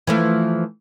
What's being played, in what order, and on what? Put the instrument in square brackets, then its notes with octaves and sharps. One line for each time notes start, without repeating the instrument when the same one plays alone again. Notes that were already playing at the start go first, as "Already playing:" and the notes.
[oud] E3 F3 A3